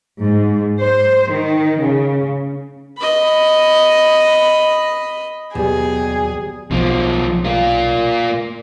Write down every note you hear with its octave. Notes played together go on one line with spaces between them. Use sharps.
G#2
C5
D#3
C#3
D#5 B5
D#2 B2 F#3 G3 G4 G#4
B1 B2 F3
A#3 F4